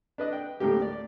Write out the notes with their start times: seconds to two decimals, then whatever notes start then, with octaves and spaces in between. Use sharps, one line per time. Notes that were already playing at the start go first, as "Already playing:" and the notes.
0.18 D4 B4 D#5
0.32 G5
0.60 D2 A2 A#3 G4
0.82 D5